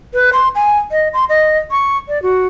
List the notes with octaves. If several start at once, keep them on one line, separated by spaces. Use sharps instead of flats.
B4
C6
G#5
D#5
C6
D#5
C#6
D5
F#4